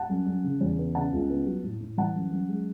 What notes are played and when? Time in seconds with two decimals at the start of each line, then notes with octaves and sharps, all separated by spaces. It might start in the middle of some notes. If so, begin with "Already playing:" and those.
Already playing: F#5 A5
0.09 F#2
0.26 F#2
0.44 C#3
0.61 E2
0.79 B3
0.95 C#3 F#5 A5
1.13 C#2
1.30 B3
1.46 F#3
1.64 A2
1.81 A2
1.97 E3 F#5 A5
2.16 F#2
2.31 F#2
2.49 G#3